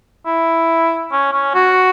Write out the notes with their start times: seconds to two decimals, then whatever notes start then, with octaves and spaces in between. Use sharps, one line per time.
0.26 E4
1.12 C#4
1.33 C#4
1.55 F#4